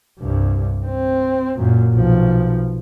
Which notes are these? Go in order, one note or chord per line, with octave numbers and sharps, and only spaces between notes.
C2 G2
C4
F#2 A#2
B1 F3